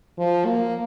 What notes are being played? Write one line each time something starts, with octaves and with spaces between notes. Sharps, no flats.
F3
A#3